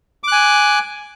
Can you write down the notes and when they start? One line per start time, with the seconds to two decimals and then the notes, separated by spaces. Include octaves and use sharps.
0.24 D6
0.28 F#6
0.32 G#5